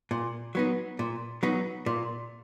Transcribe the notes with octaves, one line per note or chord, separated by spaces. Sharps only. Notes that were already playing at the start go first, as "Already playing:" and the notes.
A#2
F#3 B3 D#4
A#2
F#3 B3 D#4
A#2